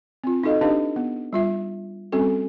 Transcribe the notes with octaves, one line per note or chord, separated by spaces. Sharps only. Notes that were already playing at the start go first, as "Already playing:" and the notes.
C4 F4
D#4 F#4 A4 D#5 F5
D4 D#4 G4 B4 D#5 F5
B3
G3 F4 E5
G3 C4 C#4 F#4 A4